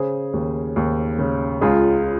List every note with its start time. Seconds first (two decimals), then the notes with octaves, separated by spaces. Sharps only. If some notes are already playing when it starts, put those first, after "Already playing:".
Already playing: C#3 G#4 C5
0.33 D#2
0.76 D#2
1.19 C#3
1.61 C#2 F4 G#4